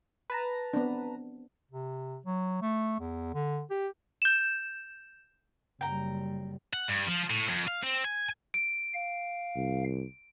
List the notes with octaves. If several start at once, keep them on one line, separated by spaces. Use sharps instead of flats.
B4 A5 A#5
B3 C4 D4
C3
F#3
A3
E2
D3
G4
G6 E7
F#1 G3 G5 A#5
F#5
G2
F3
A2
F2
F5
C4
G#5
D7
F5
C2